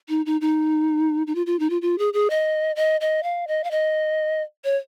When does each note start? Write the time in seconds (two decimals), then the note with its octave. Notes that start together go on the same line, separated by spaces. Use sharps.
0.09 D#4
0.26 D#4
0.41 D#4
1.27 D#4
1.35 F4
1.46 F4
1.59 D#4
1.70 F4
1.82 F4
1.98 G#4
2.13 G#4
2.30 D#5
2.76 D#5
3.01 D#5
3.23 F5
3.47 D#5
3.64 F5
3.71 D#5
4.64 C#5